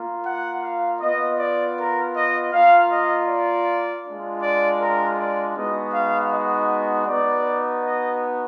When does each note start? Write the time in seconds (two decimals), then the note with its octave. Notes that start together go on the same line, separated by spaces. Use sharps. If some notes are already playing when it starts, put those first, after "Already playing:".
Already playing: A#3 F4
0.24 F#5
0.63 F5
1.01 B3 F4 D#5
1.38 D5
1.77 A#4
2.14 D#5
2.52 A#3 F4 F5
2.90 D#5
3.28 D5
4.04 G#3 D4 F4
4.42 D5
4.79 A#4
5.17 D5
5.55 G#3 B3 D#4 F#4 D#5
5.93 F5
6.32 D#5
7.06 B3 D#4 F#4 D5
7.83 D#5